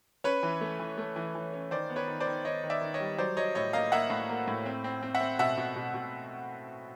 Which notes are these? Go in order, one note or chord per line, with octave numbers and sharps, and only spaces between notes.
C#4 B4 C#5
E3
A3
E3
A3
E3
E3
C#4
D#3 C5 D5
B3
B4 C#5
D#3
C5 D5
D#3
D#3 C#5 D#5
D#3
D5 E5
D#3
C#5 D#5
G3
F#3 C5 D5
F#3 C#5 D#5
A2 C#5 D#5
A#3 D#5 F5
A#3 E5 F#5
A2
A#3
A2
C4
C4
C4
E5 F#5
C4
B2 E5 F#5
B2
B2
B2